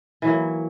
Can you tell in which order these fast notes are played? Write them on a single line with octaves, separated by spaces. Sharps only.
E3 F#3 A#3